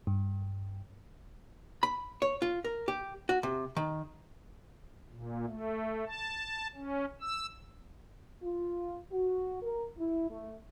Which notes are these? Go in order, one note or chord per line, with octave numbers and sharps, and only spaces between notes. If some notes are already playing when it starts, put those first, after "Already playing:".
G2
B5
C#5
F4
A#4
G4
F#4
C3
D#3
A#2
A3
A5
C#4
E6
F4
F#4
A#4
E4
A3